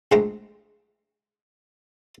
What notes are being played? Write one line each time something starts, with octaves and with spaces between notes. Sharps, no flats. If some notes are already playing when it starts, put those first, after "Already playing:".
A#1 G#3 A3 C5 G5 A#5